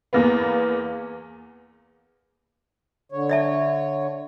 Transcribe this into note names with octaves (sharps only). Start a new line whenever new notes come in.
E2 A#3 B3
D3 C#5
D5 E5 A5